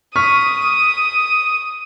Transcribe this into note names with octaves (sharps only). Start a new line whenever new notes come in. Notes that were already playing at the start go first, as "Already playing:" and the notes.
C#6 D#6 F6 B6